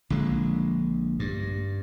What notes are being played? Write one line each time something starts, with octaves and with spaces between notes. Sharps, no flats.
A#1 D3 G#3
G2